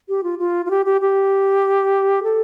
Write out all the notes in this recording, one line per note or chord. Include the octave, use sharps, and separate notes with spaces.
G4
F4
F4
F4
G4
G4
G4
A4